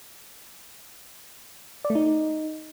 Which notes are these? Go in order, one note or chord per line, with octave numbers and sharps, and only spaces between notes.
D5
A3
D#4